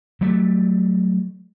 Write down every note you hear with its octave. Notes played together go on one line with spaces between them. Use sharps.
F#3 G3 A3